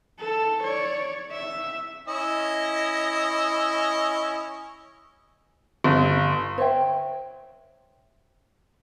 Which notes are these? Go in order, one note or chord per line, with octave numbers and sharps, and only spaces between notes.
A4
C#5 D5
E5
C#4 E4 D#5
G1
C5 C#5 E5 G5